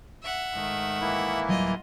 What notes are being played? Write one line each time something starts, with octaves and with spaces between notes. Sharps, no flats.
E5 F#5
G#2 D#3 A3
E3 A#3 E4
D1 F#3 G3 F4 D#5